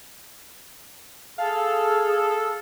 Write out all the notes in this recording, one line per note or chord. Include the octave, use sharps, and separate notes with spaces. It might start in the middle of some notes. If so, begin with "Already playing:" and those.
G#4 A4 F5